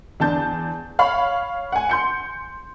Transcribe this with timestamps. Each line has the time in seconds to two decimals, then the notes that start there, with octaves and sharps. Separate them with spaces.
0.20 E2 D4 A5 G6
0.99 C#5 F5 B5 C#6
1.72 F#5 G#5
1.89 C6 G6 C#7